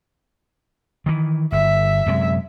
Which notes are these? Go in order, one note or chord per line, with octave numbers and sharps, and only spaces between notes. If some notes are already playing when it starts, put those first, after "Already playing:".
D#3 E3
G1 E5
F#2 C3 G#3